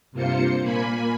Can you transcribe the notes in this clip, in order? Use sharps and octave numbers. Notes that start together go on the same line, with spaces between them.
G2 C3 A#3 F4 C5 C#7
A#2 A#3 G#5 B5